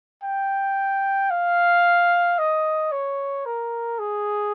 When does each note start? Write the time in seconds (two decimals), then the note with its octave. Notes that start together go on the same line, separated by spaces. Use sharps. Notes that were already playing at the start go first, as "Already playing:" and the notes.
0.23 G5
1.30 F5
2.38 D#5
2.92 C#5
3.45 A#4
3.99 G#4